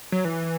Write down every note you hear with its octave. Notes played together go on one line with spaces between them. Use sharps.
F#3
E3